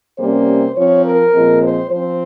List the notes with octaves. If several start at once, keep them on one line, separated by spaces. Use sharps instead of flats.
C3 G3 A#3 C#4 C5
F3 C4 C#5
A#4
A#2 F3 G#3 C4
C5
F3 C4 C5